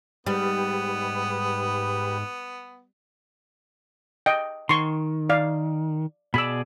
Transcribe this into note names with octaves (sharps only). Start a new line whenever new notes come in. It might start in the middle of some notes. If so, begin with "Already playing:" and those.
G#2 G3 B3 G4 B4
D#5 G5
D#3 C6 C#6
D5 F5
B2 G#4 D5 B5 E6